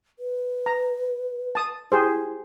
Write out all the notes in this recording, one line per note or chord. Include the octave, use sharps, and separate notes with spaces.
B4
A#5
A5 D#6
E4 G4 G#4 C5